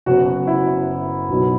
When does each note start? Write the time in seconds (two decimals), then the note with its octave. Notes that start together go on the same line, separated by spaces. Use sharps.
0.06 F#1 F#2 F#3 B3 F#4
0.26 F#4
0.47 E4
1.29 B1 B2 F#3 B3